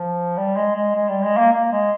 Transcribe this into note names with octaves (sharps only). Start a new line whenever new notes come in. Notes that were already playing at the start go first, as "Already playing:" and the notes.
Already playing: F3
G3
G#3
G#3
G#3
G3
G#3
A#3
A#3
G#3